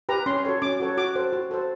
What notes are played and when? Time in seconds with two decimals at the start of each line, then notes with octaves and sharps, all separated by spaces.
0.09 G4 B4 A#5
0.26 C#4 C6
0.45 F#4 A4 C#5
0.62 C#4 D6
0.80 F#4 A4 C#5
0.97 F#4 D6
1.15 A4 C5
1.33 F#4
1.51 A4 C5